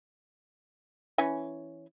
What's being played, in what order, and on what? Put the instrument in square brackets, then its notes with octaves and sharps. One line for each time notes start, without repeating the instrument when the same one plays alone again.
[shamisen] E3 C#4 G#5